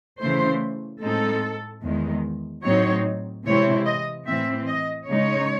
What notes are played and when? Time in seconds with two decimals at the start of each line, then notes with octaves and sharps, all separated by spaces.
0.19 C#3 E3 A3 C5
1.01 A2 G#3 C4 D#4 A4
1.83 E2 D#3 G#3
2.63 A2 F#3 C4 D#4 C#5
3.46 C3 E3 G#3 C4 E4 C#5
3.85 D#5
4.26 A2 E3 C4 E5
4.66 D#5
5.07 C#3 G#3 D#4 C#5